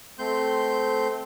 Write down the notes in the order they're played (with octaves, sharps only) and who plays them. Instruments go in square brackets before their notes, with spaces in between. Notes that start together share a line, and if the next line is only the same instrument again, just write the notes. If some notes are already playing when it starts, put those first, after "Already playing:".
[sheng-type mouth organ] A3 C4 C6 G6